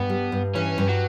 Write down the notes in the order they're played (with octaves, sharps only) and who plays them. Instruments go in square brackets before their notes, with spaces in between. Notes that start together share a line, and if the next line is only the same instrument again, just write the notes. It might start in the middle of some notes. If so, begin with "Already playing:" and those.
Already playing: [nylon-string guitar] G2 [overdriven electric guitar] B3
[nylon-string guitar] G3
G2
[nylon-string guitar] E3 [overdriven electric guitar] C#4
[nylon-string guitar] G2
[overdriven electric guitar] F#3